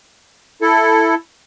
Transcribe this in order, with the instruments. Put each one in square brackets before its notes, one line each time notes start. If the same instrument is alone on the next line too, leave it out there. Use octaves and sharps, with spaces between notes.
[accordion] E4 A4